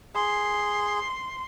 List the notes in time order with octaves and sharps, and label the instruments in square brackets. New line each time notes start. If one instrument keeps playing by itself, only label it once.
[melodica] G#4 [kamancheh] C6